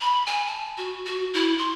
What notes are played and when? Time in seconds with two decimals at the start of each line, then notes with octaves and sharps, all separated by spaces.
0.01 B5
0.26 G#5
0.47 A5
0.78 F#4
1.06 F#4
1.34 E4
1.58 C6